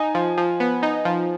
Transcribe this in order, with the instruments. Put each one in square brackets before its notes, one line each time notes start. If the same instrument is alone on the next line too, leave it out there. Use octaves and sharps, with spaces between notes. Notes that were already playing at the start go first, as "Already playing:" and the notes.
Already playing: [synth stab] D#4 [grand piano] G#5
[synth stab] F3
F3
B3
D#4
F3